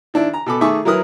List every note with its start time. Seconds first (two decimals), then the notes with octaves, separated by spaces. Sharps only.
0.14 D#3 D4 E4
0.33 A#5
0.46 B2 A4 B5 D6
0.61 D#3 A3 G#4 E5 C#6 D6
0.85 F#3 E4 A#4 B4 D#6 F6